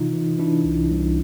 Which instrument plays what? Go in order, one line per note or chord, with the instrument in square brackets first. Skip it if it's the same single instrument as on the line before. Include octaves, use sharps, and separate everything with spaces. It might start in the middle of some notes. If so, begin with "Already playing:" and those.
Already playing: [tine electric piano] C3 E3 D#4 F4
E3
E3 D4 E4
C2
C2